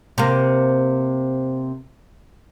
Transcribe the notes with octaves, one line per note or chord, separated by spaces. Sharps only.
C3 A#3